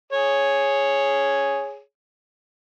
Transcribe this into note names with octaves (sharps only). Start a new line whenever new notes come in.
G#4 C#5